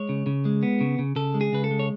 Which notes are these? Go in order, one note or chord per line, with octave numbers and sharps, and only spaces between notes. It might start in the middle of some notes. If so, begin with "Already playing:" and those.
Already playing: G#3 C#5
C#3
C#3
G#3
B3
C#3
C#3
C#3 A4
G#3
G#4
C#3 B4
A4
G#3
C#5